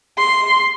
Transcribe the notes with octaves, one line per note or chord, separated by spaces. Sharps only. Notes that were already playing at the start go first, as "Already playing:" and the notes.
C6